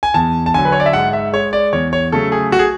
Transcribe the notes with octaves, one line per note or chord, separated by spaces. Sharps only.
G#5
E2 A5
A5
D3 F#3 G#5
B4
C#5
D5
E5
G#2 F#5
E5
G#3 C#5
D5
E2 C#5
C#5
C#3 F#3 A3 A4
G#4
F#4
G#4